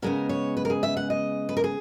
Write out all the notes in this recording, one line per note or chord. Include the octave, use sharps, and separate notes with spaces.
C#3 G#3 B3 A#4
C#5
B4
A#4
G#4
E5
F#5
D#5
B4
A#4
G#4